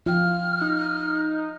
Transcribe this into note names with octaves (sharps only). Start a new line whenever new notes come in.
F3 F4 G5 F6
D#4